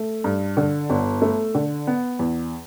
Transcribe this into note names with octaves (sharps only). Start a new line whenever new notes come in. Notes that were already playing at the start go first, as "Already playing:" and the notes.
Already playing: A3
G2
D3
G1
A3
D3
B3
E2